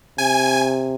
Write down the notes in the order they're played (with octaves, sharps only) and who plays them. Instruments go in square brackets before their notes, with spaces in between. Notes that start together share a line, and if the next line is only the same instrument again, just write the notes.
[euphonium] C3 [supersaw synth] G#5